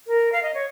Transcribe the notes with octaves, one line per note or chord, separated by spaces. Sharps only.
A#4
F5
D#5
C#5